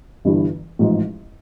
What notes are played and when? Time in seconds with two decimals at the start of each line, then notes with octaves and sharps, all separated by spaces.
0.25 G1 G2 E3
0.79 A1 G#2 F3